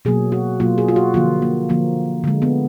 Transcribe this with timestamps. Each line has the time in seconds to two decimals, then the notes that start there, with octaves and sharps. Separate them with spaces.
0.05 B2 F#3 A#3 G#4
0.32 F#4
0.60 B2 F#3 A#3 F4
0.78 G#4
0.88 F4
0.96 F#4
1.14 D3 F3 A#3 F4
1.42 A#3
1.69 D3 F3 A#3
2.24 D3 G#3
2.42 B3